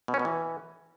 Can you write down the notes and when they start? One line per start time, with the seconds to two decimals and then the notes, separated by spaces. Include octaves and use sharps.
0.08 B2
0.14 C#4
0.19 B2
0.25 E3